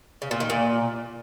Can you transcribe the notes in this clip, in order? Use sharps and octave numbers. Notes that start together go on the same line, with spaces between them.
C#3
A#2
D#3
A#2